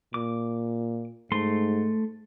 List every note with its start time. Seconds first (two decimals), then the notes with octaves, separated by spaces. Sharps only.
0.14 A#2 D6
1.32 G#2 A3 C6